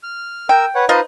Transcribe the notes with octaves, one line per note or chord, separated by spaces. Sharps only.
F6
A#4 G5 E6
B4 C#5 F#5
D#4 F4 B4 C5 D#5